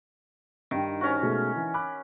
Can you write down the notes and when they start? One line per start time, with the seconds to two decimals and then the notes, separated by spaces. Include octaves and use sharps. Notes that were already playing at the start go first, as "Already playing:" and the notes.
0.71 G2 D#3
1.01 C#4 F#4
1.22 B2 G#3 A3
1.56 E3
1.74 B5 D6 F#6